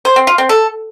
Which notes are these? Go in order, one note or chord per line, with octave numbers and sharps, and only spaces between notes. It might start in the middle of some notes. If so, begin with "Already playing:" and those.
C5
C4
F4
C4
A4